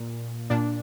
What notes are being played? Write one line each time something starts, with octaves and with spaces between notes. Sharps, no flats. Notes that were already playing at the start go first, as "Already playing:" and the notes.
Already playing: A#2
A#2 D4